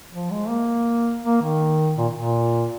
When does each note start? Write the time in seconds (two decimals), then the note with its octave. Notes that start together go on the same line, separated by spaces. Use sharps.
0.13 F3
0.31 G#3
0.49 A#3
1.23 A#3
1.42 D#3
1.97 A#2
2.16 A#2